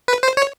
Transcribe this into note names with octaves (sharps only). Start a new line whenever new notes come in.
B4
C5
C#5